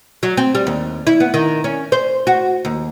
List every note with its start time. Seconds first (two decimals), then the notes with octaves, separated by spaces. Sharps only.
0.23 F#3
0.37 C4
0.55 G3
0.67 D#2
1.07 E4
1.20 B3
1.34 D#3
1.64 C#4
1.92 C5
2.27 F#4
2.65 D#2